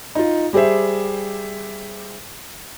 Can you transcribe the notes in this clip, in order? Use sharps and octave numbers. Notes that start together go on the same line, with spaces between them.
D#4 F4
G3 G4 G#4 C5 E5